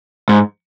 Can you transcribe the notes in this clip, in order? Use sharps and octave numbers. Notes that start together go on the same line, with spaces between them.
G#2